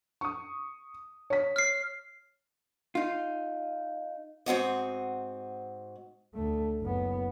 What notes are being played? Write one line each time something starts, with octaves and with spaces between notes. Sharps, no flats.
C#6 D#6
C#5 B6
F6 C7
D#4 F4
G#2 C4 F#4 D#5
D2 A3
F#1 B3